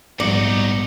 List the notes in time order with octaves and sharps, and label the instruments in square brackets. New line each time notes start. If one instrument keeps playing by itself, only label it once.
[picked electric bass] A#1 F3 B3 [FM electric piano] G#2 G3 [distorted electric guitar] D#4 F#4 [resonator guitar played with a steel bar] D5